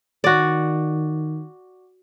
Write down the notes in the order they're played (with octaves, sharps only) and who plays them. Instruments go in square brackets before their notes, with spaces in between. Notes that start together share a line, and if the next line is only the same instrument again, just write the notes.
[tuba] D#3 [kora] F#4 D5